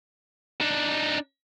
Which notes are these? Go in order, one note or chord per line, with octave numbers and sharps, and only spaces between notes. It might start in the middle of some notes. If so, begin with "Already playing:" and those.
D4 D#4